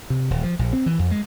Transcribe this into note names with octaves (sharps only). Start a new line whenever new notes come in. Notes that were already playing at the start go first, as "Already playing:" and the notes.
C3
D#1
F3
A#1
C4
E3
F2
G#3